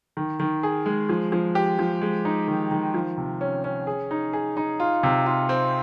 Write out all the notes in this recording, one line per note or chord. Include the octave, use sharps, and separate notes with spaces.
D#3
D#3
G#4
G#3
F3
F3
G4
F3
G#3
D#4
D#3
D#3
F3
C3
C#4
C#4
G#4
D#4
G#4
D#4
F4
C3
F4
C4